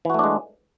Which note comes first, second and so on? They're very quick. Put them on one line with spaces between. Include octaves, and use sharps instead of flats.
E3 F#4 A3 D4 G#3